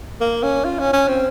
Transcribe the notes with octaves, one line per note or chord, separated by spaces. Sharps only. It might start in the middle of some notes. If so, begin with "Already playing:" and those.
A#3
C#4
F4
C#4
C#4
C4